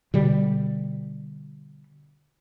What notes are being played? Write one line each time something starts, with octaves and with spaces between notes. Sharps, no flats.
B2 D3 G3